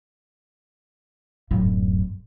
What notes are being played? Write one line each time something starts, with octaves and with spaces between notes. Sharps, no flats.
D1 F#2